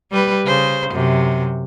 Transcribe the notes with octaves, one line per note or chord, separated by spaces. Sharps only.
G3 B4
C#3 C5
F#2 C3